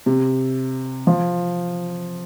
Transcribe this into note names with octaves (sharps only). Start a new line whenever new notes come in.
C3
F3